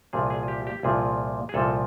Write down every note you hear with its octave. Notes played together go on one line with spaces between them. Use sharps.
C2 A#2 F3 G#4
G#4
G4
G4
C2 A#2 F3 G#4
G#4
C2 A#2 F3 A4